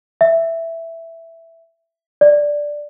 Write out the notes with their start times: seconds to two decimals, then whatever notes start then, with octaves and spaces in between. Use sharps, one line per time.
0.21 E5
2.21 D5